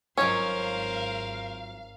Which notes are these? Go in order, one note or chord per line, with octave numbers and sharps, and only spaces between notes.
G#1 F#3 C#4 F4 A#4 C5 D#5 F5